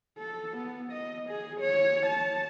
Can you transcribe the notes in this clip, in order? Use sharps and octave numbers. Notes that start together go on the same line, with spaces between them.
A4
B3
D#5
G#4
C#5
A5